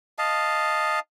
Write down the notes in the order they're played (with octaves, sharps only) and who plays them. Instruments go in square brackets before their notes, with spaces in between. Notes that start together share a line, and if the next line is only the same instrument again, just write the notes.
[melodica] D#5 F5 A5